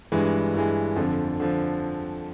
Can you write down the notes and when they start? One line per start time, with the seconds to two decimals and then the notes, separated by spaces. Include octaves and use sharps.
0.12 G2 E3 G#3
0.54 G2 E3 G#3
0.96 F2 D3 F3
1.40 D3 F3